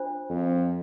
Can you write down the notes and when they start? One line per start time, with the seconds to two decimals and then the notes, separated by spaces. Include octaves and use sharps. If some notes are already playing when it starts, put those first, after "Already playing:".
Already playing: D4 F4 C5
0.29 F2